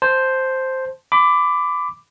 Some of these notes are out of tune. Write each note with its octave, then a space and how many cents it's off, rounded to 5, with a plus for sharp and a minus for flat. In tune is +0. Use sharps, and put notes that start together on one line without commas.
C5 +0 A5 +0
B5 +25 D6 +0